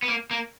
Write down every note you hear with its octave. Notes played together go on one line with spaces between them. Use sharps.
B3
A#3
A#3